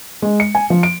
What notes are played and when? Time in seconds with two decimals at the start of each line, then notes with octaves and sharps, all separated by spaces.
0.22 G#3
0.40 C#7
0.55 G#5
0.70 F3
0.83 D7